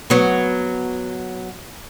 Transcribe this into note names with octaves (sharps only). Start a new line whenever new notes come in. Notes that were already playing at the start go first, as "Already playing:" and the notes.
F#3 B3